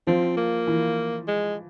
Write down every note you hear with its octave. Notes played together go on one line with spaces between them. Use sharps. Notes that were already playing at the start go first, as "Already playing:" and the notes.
F3 C4
A#3
E3
G#3